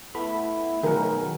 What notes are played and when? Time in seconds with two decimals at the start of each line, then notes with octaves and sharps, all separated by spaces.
0.15 A3 B3 E4 B5
0.83 B2 D#3 F#3 G#4 A#4